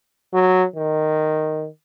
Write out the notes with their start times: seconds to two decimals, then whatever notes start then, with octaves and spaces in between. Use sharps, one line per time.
0.34 F#3
0.76 D#3